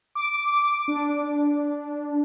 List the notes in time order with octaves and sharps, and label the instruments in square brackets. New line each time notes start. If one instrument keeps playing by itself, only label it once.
[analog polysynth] D6
D4